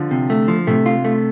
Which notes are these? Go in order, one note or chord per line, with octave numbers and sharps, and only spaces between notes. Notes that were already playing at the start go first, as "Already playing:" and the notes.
Already playing: D3 F3
C3
A3
F3
C3 A3
F4
A3